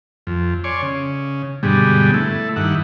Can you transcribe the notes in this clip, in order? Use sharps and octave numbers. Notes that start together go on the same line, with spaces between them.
F2
C#5 D5 G#5 C6
C#3
G2 B2 D3 G3 G#3
A3 E4
G2 D#3 E4 F#5